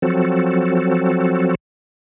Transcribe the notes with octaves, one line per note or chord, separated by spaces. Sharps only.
F3 F#3 C4 F#4 A4